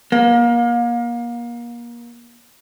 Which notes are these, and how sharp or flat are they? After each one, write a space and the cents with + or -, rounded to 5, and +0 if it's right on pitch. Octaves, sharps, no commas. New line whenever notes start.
A#3 +30